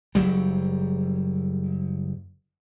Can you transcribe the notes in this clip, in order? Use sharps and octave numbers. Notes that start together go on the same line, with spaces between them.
F#1 F#3 G3